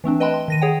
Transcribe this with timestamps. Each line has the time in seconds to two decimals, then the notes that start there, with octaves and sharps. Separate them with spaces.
0.04 E3 A3 C4 D4
0.20 B4 D#5 G5 A5 B5 C6
0.34 C6
0.48 D#3 A#6 D#7
0.61 G#4 C#5 F#5 G5